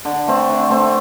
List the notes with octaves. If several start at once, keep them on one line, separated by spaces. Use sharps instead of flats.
D3
A3 C4
D3
A3 C4